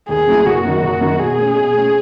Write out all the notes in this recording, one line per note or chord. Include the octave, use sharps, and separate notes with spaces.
D#2 G#4
C#3 F#3 A3 E4
F#1 F#4
F#2 D#3
F#1
F#2 D#3
B2 G#4
A3 C#4
B2
A3 C#4